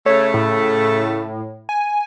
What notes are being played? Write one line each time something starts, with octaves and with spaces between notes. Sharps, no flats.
C#3 A3 C#5
A2
G#5